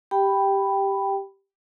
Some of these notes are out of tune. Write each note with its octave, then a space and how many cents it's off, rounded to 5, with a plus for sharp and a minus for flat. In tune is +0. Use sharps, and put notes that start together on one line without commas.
G4 +0 G5 +0 B5 +0